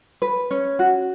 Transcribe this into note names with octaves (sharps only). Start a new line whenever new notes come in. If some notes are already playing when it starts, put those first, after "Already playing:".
B4
C#4
F#4